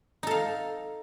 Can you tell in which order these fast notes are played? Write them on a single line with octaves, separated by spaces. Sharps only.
D#4 A4 F5